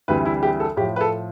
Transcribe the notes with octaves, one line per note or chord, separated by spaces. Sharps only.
D2 C3 E3 G3 B4
E4
G4
A4
A2 F3 G4
B4
A4